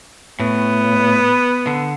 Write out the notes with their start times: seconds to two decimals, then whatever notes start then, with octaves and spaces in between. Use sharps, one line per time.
0.40 A2 B3
1.67 D3